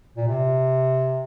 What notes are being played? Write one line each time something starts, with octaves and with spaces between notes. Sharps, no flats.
A#2
C3